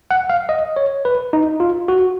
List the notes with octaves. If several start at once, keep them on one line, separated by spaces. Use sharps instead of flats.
F#5
F5
D#5
C#5
B4
D#4
F4
F#4